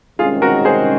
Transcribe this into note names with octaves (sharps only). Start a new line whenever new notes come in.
C2 C3 D#3 G#3 C#4 F4 G#4
F#4 A#4
G#4 C5